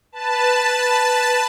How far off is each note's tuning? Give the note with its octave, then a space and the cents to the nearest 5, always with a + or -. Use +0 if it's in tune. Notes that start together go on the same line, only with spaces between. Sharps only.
B4 +0 A5 +0